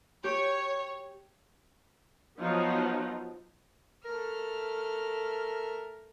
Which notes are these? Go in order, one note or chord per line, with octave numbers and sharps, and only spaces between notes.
G4 C#5
F3 F#3 B3 D#4 F4
A3 A#4 F6